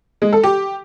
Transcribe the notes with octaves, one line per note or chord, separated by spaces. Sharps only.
G#3
A4
G4